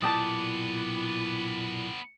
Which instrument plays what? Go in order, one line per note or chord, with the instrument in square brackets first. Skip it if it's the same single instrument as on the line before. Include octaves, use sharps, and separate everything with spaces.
[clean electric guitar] B1 A#2 G4 [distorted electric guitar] B3 D4 [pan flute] E4 [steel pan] A5 D#6